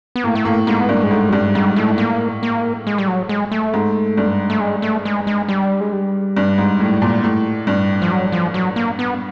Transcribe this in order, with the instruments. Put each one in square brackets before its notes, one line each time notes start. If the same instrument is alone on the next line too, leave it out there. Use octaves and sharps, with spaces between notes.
[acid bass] B3
[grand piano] A2 [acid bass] A#3
[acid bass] A3
[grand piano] A2 [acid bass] A#3
[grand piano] G#2 [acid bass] A#3
[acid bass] B3
[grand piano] G2 [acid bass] A#3
[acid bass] G#3
[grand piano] G#2 [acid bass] A3
[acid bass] F#3
[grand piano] G2 [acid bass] G3
[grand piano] G#2 [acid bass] G3
[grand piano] A2 [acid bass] A3
[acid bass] A#3
A#3
G#3
G3
F#3
G#3
A3
[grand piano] G#2
G2
[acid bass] A3
G#3
A3
G#3
G#3
G3
G#3
G3
[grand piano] G2
G#2
A2
A#2
A2
G2
[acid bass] F3
F#3
F3
F#3
A#3
B3